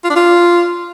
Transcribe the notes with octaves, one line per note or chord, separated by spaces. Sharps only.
F4
D4
F4